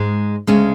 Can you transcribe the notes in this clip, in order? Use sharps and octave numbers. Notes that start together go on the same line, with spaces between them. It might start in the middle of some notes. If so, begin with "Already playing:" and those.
Already playing: G#2 G#3
D2 C#3 G#3 C#4